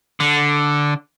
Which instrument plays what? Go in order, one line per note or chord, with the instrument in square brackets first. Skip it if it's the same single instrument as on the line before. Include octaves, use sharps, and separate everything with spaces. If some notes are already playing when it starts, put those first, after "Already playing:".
[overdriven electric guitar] D3